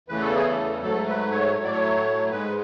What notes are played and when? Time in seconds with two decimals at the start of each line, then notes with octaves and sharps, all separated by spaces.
0.08 E2 C#3 E3 A3 B4
0.22 A4
0.35 G#4
0.48 A4
0.82 G#2 F#3 A3 A4
1.08 B4
1.32 C#5
1.56 A2 F#3 A3 C#5
1.64 D5
1.72 C#5
2.31 G#2 G#3 B4